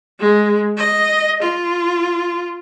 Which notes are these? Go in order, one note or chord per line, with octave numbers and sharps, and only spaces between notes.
G#3
D#5
F4